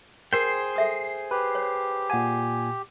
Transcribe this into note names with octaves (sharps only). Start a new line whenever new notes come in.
G#4 A#4 C5 G5
A4 E5 D#6
G4 B4
C#5
A#2 F#5 G#5 A5 D#6